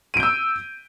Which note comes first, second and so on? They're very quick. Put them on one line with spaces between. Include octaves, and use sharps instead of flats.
D#7 D7 G6 E6